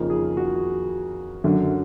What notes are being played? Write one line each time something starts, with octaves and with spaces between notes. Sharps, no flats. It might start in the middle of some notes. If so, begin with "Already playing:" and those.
Already playing: F2 C#3 F3 A#3 D#4
G#4
F#4
F#2 D3 F#3